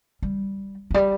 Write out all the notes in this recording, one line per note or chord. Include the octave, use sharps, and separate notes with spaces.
G3
E3
G3